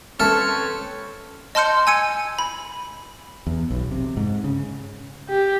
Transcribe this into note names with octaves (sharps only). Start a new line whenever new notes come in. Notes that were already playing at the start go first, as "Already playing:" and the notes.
C4 C#4 A4 B4 C#5 E5 A5 F6
D#5 A5 C6 F6 G6 C#7
G#5 E6 G#6 C#7 D#7
B5
E2
B1
C3
G#2
C#3
G4